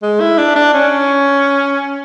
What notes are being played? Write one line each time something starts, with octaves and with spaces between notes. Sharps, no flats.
G#3
E4
D4
D4
C#4